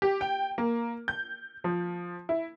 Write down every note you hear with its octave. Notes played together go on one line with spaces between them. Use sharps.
G4
G5
A#3
G6
F3
E4